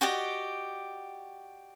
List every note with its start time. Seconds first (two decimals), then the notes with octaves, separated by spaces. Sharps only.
0.01 F#4 G4 D5 D#5